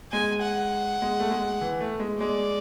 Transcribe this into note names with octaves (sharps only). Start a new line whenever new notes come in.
G#3 G#5
F#5
G#3
A3
G#3
E3
A3
G#3
G#3 D5